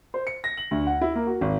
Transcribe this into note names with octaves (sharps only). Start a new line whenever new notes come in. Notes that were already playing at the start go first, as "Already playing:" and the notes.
C5
C#7
A#6
F#7
D2
F#5
E4
A#3
F#4
G#1